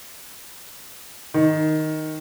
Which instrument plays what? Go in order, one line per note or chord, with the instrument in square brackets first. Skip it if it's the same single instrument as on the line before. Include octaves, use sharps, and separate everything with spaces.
[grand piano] D#3